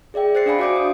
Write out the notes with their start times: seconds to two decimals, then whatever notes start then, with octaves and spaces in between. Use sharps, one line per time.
0.14 G#4 D5 E5 G5
0.35 C5 E5 F#6 A6 C7 C#7
0.46 D4 D5 E5 F5 G#5 B5
0.59 F#4 D5 F5 D6 G6 D7
0.76 D#6